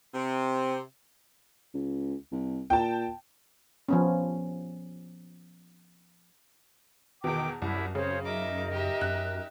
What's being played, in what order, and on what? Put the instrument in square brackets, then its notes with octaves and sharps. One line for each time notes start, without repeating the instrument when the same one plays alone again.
[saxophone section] C3 [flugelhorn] C4
[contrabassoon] C#2
C2
[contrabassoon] A#2 [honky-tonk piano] G5 A5
[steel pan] F3 B3 C#4
[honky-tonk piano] E2 B2 [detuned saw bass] D#3 [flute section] G5 D6
[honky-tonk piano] C2 [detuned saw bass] F#2 [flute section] E4
[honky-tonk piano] C#3 [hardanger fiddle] C4 [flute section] C5 C#5
[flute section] D#4 A#4 D#5 [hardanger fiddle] E5 D6
[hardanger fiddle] G4 E5
[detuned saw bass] F#2 [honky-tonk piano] F#6